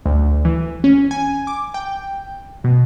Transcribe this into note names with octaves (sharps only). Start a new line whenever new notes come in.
D2
E3
C#4
G#5
D6
G5
B2